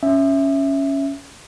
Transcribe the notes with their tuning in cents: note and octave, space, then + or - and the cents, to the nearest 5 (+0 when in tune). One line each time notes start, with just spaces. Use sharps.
C#4 +0 E5 +0